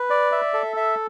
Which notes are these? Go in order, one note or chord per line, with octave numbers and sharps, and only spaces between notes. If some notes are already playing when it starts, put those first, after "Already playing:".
Already playing: B4
D5
E5
A4
E5